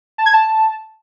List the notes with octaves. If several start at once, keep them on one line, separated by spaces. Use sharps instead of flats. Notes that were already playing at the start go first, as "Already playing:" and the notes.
A5
G#6
A5